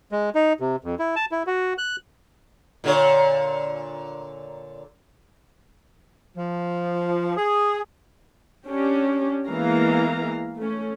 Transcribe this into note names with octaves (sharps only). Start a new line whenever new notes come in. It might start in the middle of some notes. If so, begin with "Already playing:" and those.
G#3
D#4
C3
F2
E4
A5
E4
F#4
F#6
A#2 D3 C#5
F3
G#4
C#4 D4 G4
E3 G#3 A#3 B3 F5 A#5
A3 C#4